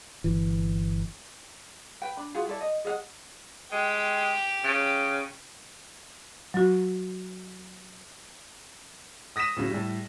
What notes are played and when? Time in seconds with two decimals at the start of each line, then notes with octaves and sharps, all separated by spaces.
0.24 G1 E3
2.02 B4 G5
2.17 D4 B5
2.35 F4 F#4 G#4
2.47 E4 A4 D5
2.61 D#5
2.85 G#4 D#5 F5 F#5
3.72 G#3 G4 G5
4.64 C#3
6.54 F#3 F#4
9.36 D#6 A#6 B6 D#7 E7
9.56 A2 C#3 F#3
9.71 A2 G3